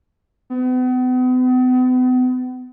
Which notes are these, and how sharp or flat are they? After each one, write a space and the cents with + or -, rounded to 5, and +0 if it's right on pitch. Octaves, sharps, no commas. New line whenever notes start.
B3 +40